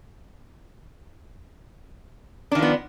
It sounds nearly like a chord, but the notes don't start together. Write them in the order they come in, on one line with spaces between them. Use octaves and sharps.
D4 D#3 F3 B3